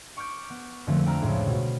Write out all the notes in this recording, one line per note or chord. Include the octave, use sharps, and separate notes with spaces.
C#6 D6 F6 G6 D7
B3
F2 D3 F3 A3 C4
G5 A#5 B5 F6
C#2 A2 F3
B2